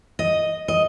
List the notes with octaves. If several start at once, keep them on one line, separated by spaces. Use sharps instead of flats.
D#5
D#5